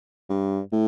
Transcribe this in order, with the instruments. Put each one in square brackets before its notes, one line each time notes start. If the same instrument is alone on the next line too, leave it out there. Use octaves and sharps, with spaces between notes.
[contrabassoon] G2
A2